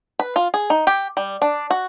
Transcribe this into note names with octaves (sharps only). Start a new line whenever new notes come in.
B4
F4
G#4
D#4
G4
G3
D4
F#4